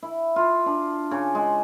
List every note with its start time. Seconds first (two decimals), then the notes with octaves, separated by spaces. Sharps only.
0.03 E4
0.36 F4
0.66 D4
1.11 C#3
1.35 G#3